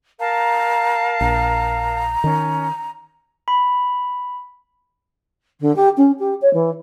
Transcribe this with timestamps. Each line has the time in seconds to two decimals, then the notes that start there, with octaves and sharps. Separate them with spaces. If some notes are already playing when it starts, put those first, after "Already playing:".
0.20 A#4 F5 A5 A#5
1.21 A#1 A#5
2.24 D#3 C#4
3.48 B5
5.60 D3
5.76 G4
5.97 C#4
6.19 G4
6.41 C#5
6.53 E3